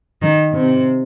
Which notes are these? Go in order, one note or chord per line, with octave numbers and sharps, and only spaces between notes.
D#3
C3